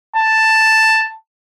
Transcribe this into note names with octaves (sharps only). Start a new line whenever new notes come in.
A5